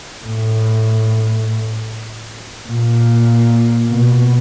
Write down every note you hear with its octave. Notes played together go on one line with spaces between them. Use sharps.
A2
A#2
B2